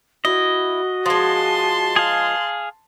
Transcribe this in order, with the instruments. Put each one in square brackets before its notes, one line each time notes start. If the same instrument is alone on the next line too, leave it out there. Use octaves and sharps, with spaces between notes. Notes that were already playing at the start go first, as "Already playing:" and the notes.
[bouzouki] E4 [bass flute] F#4 [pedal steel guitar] D#5
[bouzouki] F3 G#3 [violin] A5 C6
[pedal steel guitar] G#4 F5